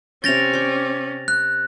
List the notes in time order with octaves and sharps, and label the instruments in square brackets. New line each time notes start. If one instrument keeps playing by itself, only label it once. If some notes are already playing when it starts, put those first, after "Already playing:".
[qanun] C3 G5 [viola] C#4 [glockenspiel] A6 A#6 F7
[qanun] D5 G5
[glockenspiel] F#6